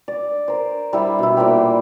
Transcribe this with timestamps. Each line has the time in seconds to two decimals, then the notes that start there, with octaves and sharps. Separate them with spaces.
0.08 D5
0.48 A#4 C5
0.93 G3 E4 C5
1.19 B2 E4
1.37 A#2 A#4 C5 G5